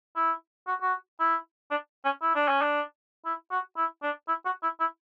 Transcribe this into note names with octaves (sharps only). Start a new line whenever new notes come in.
E4
F#4
F#4
E4
D4
C#4
E4
D4
C#4
D4
E4
F#4
E4
D4
E4
F#4
E4
E4